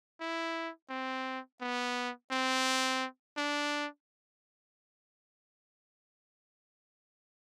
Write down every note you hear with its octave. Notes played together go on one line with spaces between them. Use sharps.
E4
C4
B3
C4
D4